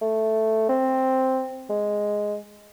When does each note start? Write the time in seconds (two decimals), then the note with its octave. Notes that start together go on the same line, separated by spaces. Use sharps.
0.02 A3
0.69 C4
1.70 G#3